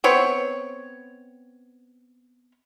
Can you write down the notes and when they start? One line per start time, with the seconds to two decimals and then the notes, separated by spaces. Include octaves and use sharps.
0.04 B3 C4 C#5